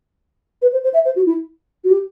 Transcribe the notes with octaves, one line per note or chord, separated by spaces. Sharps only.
B4
C5
C5
E5
C5
F#4
E4
F#4
G4